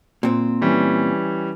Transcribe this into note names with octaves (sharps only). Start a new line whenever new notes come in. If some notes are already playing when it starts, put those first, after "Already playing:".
A#2 C4
E3 G3 C#4